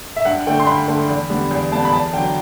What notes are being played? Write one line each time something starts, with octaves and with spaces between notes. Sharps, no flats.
E5
G2 F#5
D3 A3 G5
C6
G2 B5
D3 A3
E2
D3 G3 B3
E2
D3 G3 B3 A5
B5
E2 A5
D3 F#3 G5